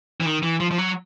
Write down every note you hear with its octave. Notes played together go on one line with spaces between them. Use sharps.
E3
D#3
E3
F3
F3
F#3